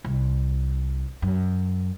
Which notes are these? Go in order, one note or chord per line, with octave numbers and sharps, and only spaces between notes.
C2
F#2